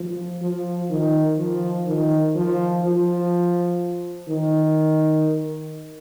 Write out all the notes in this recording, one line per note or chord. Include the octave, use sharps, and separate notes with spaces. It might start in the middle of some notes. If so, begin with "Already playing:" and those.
Already playing: F3
F3
D#3
F3
D#3
F3
F3
D#3